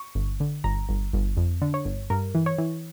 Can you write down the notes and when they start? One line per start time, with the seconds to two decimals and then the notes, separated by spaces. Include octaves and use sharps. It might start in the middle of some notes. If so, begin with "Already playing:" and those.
Already playing: C#6
0.15 G1
0.40 D3
0.64 G1 A#5
0.89 G1
1.13 G1
1.37 F2
1.62 D3
1.74 C#5
1.85 G1
2.10 G2 A#4
2.35 E3
2.46 C#5
2.58 E3